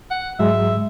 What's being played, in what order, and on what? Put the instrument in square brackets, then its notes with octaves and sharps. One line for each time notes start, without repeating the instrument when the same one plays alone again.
[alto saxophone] F#5
[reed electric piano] G#2 F#3 G#3 [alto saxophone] E5